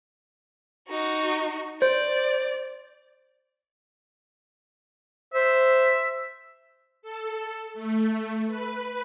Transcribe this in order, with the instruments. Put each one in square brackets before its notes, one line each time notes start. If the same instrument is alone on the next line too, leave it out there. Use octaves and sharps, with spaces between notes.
[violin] D#4 F#4
[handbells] C5 [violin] D5
[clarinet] C5 [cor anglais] E5
[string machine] A4
A3
B4